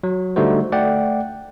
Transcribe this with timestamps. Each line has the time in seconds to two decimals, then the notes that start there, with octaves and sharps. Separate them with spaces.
0.03 F#3
0.36 D3 G3 A3 D#4 F#4 C5
0.72 A3 D5 F#5 G5